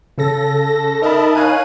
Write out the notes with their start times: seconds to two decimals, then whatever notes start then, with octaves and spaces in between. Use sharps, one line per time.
0.18 C#3 A4 A#6
1.02 D#4 A#4 D#5 E5 A5 B5
1.35 D#4 C#5 F5 G#5 F#6 D#7